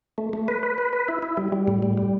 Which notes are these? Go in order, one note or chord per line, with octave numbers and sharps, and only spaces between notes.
A3
A3
B4
B4
B4
B4
E4
E4
G3
G3
A2
G3
G3